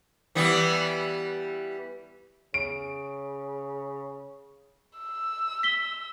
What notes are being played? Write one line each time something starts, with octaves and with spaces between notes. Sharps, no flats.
E3 G3 B3
C#3 D7
E6
B6 G7